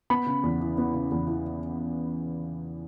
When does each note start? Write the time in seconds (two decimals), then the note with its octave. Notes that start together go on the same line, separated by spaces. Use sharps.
0.10 B3 B5
0.26 C#3
0.43 E2
0.60 E3
0.78 B3
0.94 C#3
1.12 E2
1.27 E3